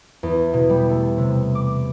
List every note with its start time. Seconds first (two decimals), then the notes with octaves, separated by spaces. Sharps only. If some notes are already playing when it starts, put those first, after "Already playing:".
0.23 E2
0.54 B2
0.69 G3
0.90 A3
1.18 C3
1.55 D6